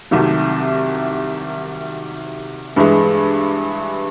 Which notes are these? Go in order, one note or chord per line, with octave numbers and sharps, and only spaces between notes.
C2 C3 D#3 F#3 A3
G2 E3 G#3